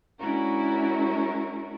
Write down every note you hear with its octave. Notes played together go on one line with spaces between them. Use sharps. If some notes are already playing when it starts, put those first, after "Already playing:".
G#3 C#4 D4 E4 F#4 A#4